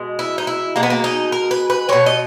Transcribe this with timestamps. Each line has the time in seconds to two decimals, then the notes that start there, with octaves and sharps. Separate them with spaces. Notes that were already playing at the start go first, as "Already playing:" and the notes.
Already playing: B2 G#3
0.19 E4
0.38 D#4
0.47 E4
0.76 B2 G#3 A#3
0.83 B3
0.90 A#3
1.04 D#4
1.32 A#4
1.51 B4
1.70 B4
1.89 B2 G#3 C#5
2.06 D#5